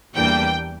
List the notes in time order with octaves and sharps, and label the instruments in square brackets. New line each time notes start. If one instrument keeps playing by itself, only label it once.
[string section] E2 E3 G3 A#3 D4 G5